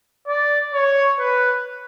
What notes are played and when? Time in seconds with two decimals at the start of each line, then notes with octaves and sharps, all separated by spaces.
0.27 D5
0.73 C#5
1.19 B4